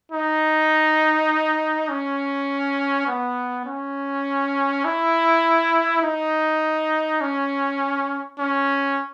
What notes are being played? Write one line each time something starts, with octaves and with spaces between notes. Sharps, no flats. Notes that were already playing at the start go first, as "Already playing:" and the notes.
D#4
C#4
B3
C#4
E4
D#4
C#4
C#4